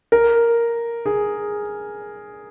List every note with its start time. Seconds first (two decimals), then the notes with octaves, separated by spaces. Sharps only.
0.12 A#4
1.06 G#4